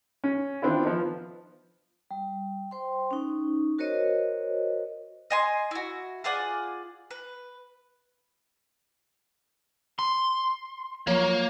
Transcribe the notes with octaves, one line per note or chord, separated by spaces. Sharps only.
C#4
D#3 B3 C4 D4 E4 F4
F3 B3 D#4
G3
C5 G5 C6
C#4 D#4
F#4 A#4 C5 C#5 D#5
D#5 G#5 C6
E4 F#4
F4 G#4 D5 F#5
B4
C6
F3 F#3 A#3 C#5